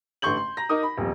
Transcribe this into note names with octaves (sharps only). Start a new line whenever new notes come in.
A1 D3 C6 C#6 G6 F#7
C6
A#5 A#6
D#4 A#4 D6 D#6
B5
D#1 F2